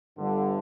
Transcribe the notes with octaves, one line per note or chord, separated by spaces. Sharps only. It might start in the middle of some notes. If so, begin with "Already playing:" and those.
G1 G2 D3 G3 B3